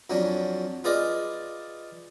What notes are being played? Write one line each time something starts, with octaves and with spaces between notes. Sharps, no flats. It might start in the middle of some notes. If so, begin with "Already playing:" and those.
F2 F#3 C#4 D4
F4 G#4 B4 D5 D#5 F5